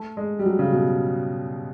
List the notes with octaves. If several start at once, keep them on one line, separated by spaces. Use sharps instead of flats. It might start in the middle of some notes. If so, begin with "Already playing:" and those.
Already playing: A3
G#3
G3
F#3
C#3
B2